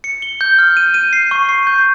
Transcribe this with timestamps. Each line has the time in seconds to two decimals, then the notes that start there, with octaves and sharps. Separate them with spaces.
0.04 C#7
0.22 G7
0.41 G6
0.59 F6
0.77 D#7
0.94 D#7
1.13 C7
1.31 C#6
1.49 C7
1.67 G6